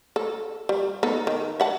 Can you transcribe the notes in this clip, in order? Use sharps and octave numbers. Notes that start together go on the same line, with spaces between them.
A4
G3
B3 D#4 A4
D#3
E5 F#5 A5